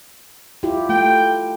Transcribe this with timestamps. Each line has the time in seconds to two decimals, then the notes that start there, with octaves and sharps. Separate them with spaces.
0.63 E4 F4 G4
0.89 A3 G5